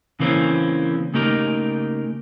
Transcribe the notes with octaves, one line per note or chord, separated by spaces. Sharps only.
C#3 E3 A#3 C4 C#4
C#3 A3 A#3 D#4 G4 A#4